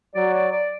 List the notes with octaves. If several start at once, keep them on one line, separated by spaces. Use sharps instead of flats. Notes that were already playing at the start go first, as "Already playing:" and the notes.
F#3 D5
D5
D5